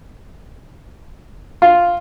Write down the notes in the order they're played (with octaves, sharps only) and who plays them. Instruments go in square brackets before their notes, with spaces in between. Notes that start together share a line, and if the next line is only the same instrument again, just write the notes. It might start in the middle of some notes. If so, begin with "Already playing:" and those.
[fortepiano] F4